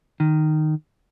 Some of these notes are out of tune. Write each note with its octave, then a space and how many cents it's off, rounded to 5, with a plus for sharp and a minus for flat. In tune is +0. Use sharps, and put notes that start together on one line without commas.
D#3 -10